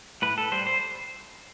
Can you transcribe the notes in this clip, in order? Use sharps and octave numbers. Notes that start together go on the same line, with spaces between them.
A2 B4
A4
G3 C5
C5